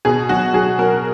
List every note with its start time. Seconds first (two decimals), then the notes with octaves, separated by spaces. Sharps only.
0.05 B2 G#4
0.29 F#3 F#4
0.54 F#3 G#4
0.78 F#3 A#4